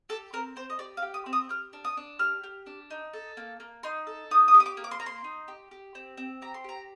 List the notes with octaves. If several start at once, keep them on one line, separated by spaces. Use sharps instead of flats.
G4 A4
C4 A#4
C4 C5
D#5
G4 D5
F5
G4
D#6
C4
D#6
G4 F6
D4
D#6
D4
G4 F6
G4
D4
D#4
A4
A#3
A#3
D#4 C6
A4
D#4 D#6
D#6
G4
D#6
D6
A#3
D6
C6
A#3 A#5
C6
D#4
G4
G4
C4
C4
G4 A#5
C6
G4 A#5